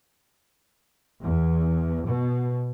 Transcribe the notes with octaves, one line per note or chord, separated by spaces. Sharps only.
E2
B2